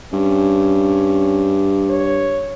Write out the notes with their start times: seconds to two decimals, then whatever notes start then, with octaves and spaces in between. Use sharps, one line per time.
0.13 G2 C#4
1.90 C#5